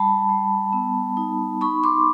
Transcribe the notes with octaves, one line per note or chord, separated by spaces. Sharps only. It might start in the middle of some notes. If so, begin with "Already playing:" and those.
Already playing: G3 A5 B5
G3
B3
D#4
D#4 B5 C#6
C6 D6